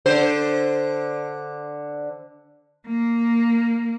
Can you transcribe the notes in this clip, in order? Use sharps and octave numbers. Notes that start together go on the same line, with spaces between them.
D3 C5
A#3